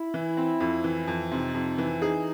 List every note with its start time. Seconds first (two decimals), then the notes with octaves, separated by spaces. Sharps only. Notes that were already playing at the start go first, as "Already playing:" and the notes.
Already playing: E4
0.14 E3
0.37 C4
0.60 F2
0.84 E3
1.07 F2
1.31 C3 D#4
1.54 F2
1.78 E3
2.02 D#4 G#4